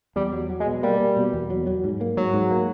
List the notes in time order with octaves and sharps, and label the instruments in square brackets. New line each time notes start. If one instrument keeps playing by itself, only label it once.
[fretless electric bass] E2 [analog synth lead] G3
[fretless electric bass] F#3
F#3
[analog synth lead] G#3
[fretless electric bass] B2
[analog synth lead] G3 [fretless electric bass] A#3
[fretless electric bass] A#3
B2
E2
F#3
F#3
G#2
A#3
[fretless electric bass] G#2 [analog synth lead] F#3
[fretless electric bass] G#2
A#3